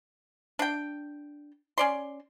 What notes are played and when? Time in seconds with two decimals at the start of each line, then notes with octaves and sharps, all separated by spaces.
0.59 D4 G5
1.78 C#4 D5 C6